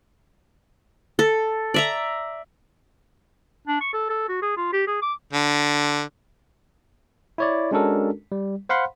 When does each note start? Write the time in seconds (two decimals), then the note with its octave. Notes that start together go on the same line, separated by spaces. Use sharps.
1.19 A4
1.74 D5 E5 A#5
3.67 D4
3.81 C#6
3.93 A4
4.09 A4
4.29 F#4
4.42 G#4
4.57 F4
4.73 G4
4.87 G#4
5.02 D6
5.33 D3
7.38 E4 C#5 D5
7.71 G#3 C#4 D4 F#4 A4 A#4
8.32 G3
8.69 C5 F5 F#5 B5 C6